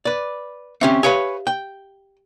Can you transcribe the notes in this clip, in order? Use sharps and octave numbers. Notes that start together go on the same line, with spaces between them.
B4 D5
C4 C#4 G4 E5
G4 B4 C#5 F5 G#5
G5